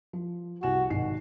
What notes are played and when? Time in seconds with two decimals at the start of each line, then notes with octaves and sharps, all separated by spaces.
0.13 F3
0.63 C2 F#4 G#5 E7
0.90 G#1 B2 D#3 C7